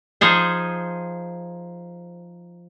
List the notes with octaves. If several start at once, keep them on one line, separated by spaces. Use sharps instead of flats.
F3 D#4 G#4 C5